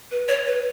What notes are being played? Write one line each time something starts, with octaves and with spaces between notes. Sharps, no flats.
B4
C#5
B4